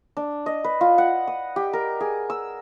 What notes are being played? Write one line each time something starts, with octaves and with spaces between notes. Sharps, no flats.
D4
D#5
B4
F4
F#5
D#6
G4
A#4
G#4
E6